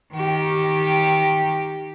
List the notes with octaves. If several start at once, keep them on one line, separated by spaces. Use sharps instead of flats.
D#3 G4